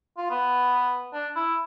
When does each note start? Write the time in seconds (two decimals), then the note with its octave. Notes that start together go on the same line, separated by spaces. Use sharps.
0.17 F4
0.30 B3
1.13 D4
1.36 E4